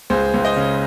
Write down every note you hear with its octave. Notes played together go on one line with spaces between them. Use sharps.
C#2 G#4 C5
C#2
C5 D#5
C#3